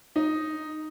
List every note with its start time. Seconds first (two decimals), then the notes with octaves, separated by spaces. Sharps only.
0.16 D#4